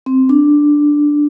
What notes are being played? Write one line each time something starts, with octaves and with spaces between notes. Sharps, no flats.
C4
D4